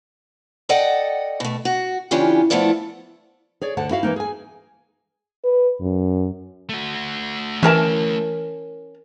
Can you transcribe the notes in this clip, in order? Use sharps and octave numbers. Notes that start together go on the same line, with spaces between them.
A4 D5 D#5 F#5 G5
B2 A3
F#4
C#3 E3 C#4 D4 F4 G4
F3 A3 B3 E4 A4 D5
G#4 C#5 D5
D2 D3 F#5 A5
E4 F#4 F5
E3 F#3 A#3 D#4
G#4 G#5
B4
F#2
A3 F#4
E3 C#4 A#4 A5